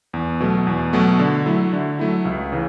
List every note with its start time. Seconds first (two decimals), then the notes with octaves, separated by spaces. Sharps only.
0.14 E2
0.40 B2 F#3 A3
0.67 E2
0.93 B2 F#3 A3
1.19 D3
1.46 F#3 A3 E4
1.73 D3
1.99 F#3 A3 E4
2.25 C#2
2.52 C#3 E3